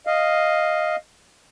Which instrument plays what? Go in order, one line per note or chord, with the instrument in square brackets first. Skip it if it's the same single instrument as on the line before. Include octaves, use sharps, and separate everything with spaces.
[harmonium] D#5 F5